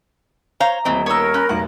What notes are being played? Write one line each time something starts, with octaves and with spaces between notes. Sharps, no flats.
C5 C#5 F5 A#5
D#1 E3 A3 C4 D#5
B3 D#4 A#4 C#5 E6
C#4 B5 F#6
F1 B1 F#5